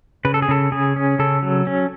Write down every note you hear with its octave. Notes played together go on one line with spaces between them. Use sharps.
C#3 B4
A4
G#4
C#3 A4
C#3 G#4
C#4
C#3 A4
F#3
C#4